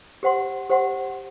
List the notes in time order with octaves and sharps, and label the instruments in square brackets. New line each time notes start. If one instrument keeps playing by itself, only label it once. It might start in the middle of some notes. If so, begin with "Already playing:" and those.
[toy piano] G4 C5 F#5 C6
G4 C5 F#5 C6